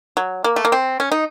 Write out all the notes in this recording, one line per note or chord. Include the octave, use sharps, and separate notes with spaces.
F#3
A#3
A3
A#3
C4
C#4
D#4